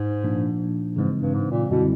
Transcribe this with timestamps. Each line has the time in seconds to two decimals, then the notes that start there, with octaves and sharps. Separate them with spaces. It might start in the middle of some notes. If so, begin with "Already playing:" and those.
Already playing: G#2
0.23 A#2 F3 A#3 D4
0.96 G#2 C#3 E3 G#3 C4
1.22 G2
1.34 G#2
1.51 A#2
1.70 F#2 B2 D3 G3 C4 E4